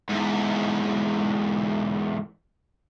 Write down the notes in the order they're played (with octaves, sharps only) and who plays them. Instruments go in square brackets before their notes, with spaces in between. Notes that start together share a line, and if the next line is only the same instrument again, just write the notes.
[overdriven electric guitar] E2 G#2